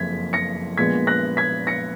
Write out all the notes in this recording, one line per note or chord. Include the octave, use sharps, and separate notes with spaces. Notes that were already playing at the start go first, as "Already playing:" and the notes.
Already playing: F#1 F2 G#6 B6
A#6 C#7
A#1 A#2 G#3 B3 G#6 B6
F#6 A#6
G#6 B6
A#6 C#7